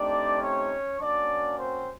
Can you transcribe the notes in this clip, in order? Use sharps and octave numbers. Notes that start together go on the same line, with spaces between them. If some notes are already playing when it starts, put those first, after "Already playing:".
Already playing: A3 C4 D4 D#4 G4 D5
C#4 C#5
A#3 C#4 D4 F#4 D5
C4 C5